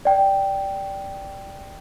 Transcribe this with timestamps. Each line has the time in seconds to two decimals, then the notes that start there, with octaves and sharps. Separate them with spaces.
0.05 D5 G5